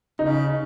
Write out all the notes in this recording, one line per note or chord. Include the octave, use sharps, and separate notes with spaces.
C#3 D#4